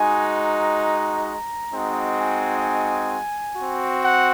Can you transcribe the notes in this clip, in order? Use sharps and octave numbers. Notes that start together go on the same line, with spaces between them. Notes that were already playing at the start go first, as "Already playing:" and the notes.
Already playing: G#3 D#4 F#4 G#5
A#5
G#3 C4 D#4 F#4
G#5
C4 F#4
F#5